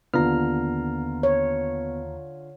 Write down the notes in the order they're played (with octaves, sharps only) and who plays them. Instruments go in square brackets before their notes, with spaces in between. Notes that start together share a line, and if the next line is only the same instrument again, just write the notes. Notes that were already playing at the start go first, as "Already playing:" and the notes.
[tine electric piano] D#2 A#5 F6 [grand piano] D3 F4 [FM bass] B3
[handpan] C#5